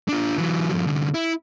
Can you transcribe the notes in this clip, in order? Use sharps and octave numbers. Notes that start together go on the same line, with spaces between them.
D4 F4
E3 F#3
G2 F3
C2 D3
E4